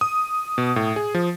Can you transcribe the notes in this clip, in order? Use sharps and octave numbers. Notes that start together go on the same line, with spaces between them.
D#6
B2
A2
G#4
F3